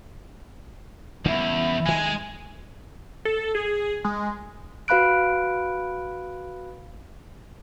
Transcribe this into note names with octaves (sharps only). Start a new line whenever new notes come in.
E2 C#3 G3 G#3 E4
D2 D#3 G#3 G#5
A4
G#4
G#3
F#4 B4 F5 B5 F#6 D7